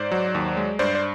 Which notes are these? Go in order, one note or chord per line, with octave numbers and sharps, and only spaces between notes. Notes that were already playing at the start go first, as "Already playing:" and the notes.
Already playing: G#2 C5 D5
F#3
D#2
G#3
G2 C5 D5
D5